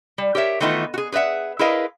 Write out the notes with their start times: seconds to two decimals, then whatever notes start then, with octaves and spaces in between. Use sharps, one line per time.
0.18 G3
0.35 G4 A#4 C#5 E5
0.60 D#3 E3 A3 B3 D#4 F4
0.94 F#4 G#4
1.12 G#4 B4 D5 E5 F#5
1.59 E4 G#4 A#4 B4 D#5 F5